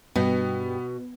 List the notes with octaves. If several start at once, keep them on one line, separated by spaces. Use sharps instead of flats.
G2 B2 G3 B3 G5